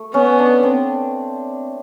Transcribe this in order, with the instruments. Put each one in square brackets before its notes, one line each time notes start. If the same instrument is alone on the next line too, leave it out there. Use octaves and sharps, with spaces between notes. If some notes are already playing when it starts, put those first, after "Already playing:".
Already playing: [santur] A3
[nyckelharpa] B3 [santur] C#4
[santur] D4
C4